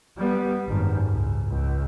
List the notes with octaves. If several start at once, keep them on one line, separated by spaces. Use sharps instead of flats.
G3 B3
G#1 F#2
C#2
C#2